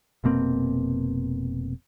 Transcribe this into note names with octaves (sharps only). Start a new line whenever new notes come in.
F1 B2 A#3 C4